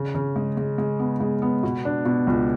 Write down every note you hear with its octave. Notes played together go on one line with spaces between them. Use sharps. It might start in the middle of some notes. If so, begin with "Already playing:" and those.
Already playing: C#3
C#3
G#3
G#3
G#3
B3
G#3
B3
B2
D4
B2
C#2